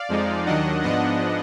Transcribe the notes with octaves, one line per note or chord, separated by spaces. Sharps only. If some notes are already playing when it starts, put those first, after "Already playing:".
Already playing: D5 F5
F2 F3 G#3 D#4
D#2 D#3 F#3 D4 D#5 F#5
G#2 F3 B3 D4 D#5 F#5